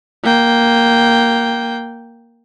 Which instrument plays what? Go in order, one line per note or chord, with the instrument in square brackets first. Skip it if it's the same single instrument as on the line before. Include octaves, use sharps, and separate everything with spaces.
[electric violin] A#3 G5